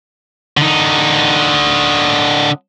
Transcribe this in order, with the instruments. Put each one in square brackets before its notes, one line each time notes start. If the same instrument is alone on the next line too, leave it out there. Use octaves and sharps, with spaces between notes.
[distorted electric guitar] D3 D#4